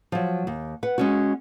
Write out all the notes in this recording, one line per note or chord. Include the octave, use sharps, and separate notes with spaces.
F3 F#3
D#2
B4 F#5
G#3 C#4 F#4